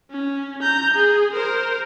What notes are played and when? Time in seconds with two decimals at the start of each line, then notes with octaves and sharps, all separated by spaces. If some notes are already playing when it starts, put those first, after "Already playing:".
0.11 C#4
0.63 A#5 G6
0.94 G#4
1.33 A#4 C5